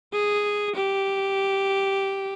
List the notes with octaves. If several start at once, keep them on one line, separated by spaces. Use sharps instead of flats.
G#4
G4